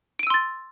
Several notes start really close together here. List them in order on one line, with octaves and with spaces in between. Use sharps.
D7 D#7 E6 C6 A6